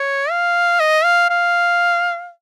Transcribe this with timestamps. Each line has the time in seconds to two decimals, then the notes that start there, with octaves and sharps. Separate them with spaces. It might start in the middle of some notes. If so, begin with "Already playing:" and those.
Already playing: C#5
0.30 F5
0.80 D#5
1.04 F5
1.30 F5